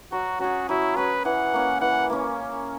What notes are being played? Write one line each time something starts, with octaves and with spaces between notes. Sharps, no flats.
F#3 F#4
C#4 F#4 G#4
F#3 E4
C#4 G#4 B4
E3 F#5
A#3 C#4
E3 F#5
A#3 C#4